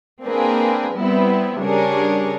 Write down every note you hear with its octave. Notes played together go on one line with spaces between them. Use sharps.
A#3 C4 D4 G#4 A#4 B4
G3 B3 C4 E4
C#3 G3 D4 G#4 A#4 C#5